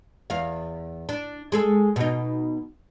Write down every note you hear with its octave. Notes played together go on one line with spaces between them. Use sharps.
E2 F5
D4
G#3 G#4 A4
B2 D#4